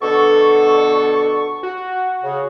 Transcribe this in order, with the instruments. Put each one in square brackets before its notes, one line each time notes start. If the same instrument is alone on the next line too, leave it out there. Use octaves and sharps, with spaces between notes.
[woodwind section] B2 D3 A4 [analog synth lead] C#6
[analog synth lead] F#4
[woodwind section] C#3